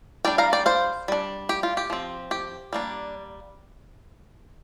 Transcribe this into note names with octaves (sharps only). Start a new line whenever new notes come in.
G3 D4 D5 G5
F5 A#5
D5 G5
C5 F5
G3 D4
G4
F4
G4
F3 C4
G4
G3 A#3 D4